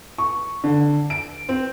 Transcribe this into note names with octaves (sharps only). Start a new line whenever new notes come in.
C#6
D3
D7
C4